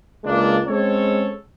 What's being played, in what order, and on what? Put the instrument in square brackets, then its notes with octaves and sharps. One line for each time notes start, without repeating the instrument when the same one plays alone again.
[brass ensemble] C#2 G#3 A#3 D4
G#3 C4 C#4 A4 C#5